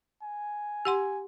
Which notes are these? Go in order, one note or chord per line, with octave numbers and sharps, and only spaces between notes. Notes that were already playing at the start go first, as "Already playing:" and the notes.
G#5
G4 F#5 C6